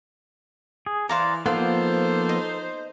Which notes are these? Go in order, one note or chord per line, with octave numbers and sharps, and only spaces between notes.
G#4
E3 C5 D5 F5 A#5
F3 A#3 B3 D#4 F4 A4 C5
D#5